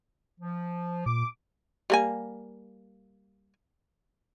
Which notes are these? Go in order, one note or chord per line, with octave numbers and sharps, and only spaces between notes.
F3
A#2 D6
G3 A#3 G#5